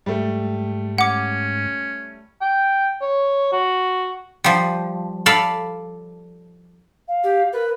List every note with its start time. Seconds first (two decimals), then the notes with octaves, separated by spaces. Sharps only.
0.06 G#2 G3 A3
0.98 C#4 F#5 D6
2.41 G5
3.01 C#5
3.52 F#4
4.44 F3 G3
5.26 A4 D5 F5 B5
7.08 F5
7.24 G4
7.53 A#4 B4